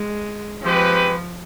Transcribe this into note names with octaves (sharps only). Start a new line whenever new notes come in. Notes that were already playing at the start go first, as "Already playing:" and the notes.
Already playing: G#3
F3 G#3 C4 G4 B4